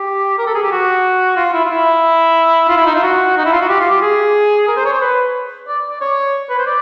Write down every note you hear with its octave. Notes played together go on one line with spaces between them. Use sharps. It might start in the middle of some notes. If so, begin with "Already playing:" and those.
Already playing: G4
A#4
A4
G#4
G4
F#4
F4
E4
F4
E4
F4
E4
D#4
F4
F#4
D#4
E4
F4
F#4
G4
F4
G4
G#4
A#4
C5
C#5
C5
B4
D5
D5
C#5
B4
C5
D5